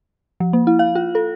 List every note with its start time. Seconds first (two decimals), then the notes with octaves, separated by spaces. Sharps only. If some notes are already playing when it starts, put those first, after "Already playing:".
0.40 F3
0.53 A#3
0.67 E4
0.79 F5
0.95 F4
1.15 A4